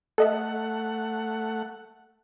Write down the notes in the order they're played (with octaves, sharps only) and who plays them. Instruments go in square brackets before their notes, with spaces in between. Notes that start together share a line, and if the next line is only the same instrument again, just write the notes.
[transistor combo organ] A3 F#5 [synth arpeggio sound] A4 D#5 E5